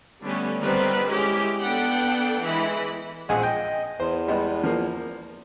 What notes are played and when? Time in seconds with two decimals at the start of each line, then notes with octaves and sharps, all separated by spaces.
0.22 D3 G3 A3 B3 C#4
0.59 D3 D#3 G3 B3 C4 B4
1.08 G#3 C#4 E4 G4
1.60 B3 D4 A4 F#5 G5
2.44 E3 G#3 E4 B5
3.29 A#1 G#3 C4 G#4 F#5 G#5
3.43 D#5 G5
4.00 E2 C5
4.28 G3 G#3 B3
4.64 F3 A#3